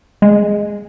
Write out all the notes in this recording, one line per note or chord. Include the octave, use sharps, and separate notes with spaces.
G#3